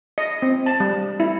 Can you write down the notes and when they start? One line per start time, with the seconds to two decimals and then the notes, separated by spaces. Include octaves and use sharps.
0.18 D#5
0.42 C4
0.66 A5
0.80 G3
1.20 E4